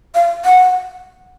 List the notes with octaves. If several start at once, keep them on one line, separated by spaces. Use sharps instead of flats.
F5
F#5